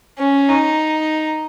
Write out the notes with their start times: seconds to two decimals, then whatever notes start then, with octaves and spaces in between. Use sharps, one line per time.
0.18 C#4
0.49 D#4